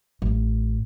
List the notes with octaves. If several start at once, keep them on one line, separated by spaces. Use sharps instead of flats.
A1